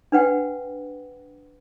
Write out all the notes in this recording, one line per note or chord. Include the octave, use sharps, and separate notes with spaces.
D4 B4 F#5 G5